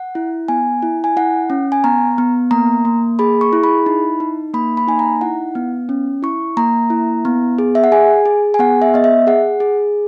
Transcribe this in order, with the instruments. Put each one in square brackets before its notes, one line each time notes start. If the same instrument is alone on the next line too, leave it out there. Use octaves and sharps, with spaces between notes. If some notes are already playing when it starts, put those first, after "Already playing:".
Already playing: [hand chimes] F#5
E4
B3 G#5
E4
G#5
E4 F#5
C#4
G#5
B3 A#5
B3
A#3 A#5
A#3
G#4 B5
C#6
E4
B5
D#4
D#4
A#3 B5
B5
D#4 G#5
A#5
E4 F#5
B3
C#4
E4 C#6
A#3 A#5
E4
B3
G#4
E5
F#5
G#4 G#5
G#4
G#5
B3 F#5
E5
B3 D#5
E5
G#4 F#5
G#4